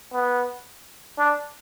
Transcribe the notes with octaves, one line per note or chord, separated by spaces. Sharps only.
B3
D4